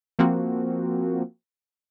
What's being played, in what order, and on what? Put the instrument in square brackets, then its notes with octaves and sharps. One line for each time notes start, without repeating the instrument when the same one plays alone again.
[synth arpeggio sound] F3 A#3 C4 F#4